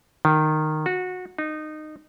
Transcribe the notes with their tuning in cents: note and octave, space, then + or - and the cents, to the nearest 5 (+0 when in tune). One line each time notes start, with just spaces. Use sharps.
D#3 -10
F#4 -20
D#4 -20